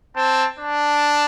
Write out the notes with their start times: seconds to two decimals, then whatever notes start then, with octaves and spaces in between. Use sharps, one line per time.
0.16 C4 A5
0.59 D4 A5